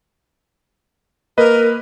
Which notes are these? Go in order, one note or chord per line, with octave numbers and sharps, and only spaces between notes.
A#3 A#4 B4 D#5